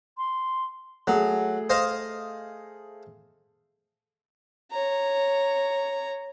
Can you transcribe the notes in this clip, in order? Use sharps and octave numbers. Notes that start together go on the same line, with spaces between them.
C6
F#3 A3 G#4
C5 D#5 F5
C#5 A#5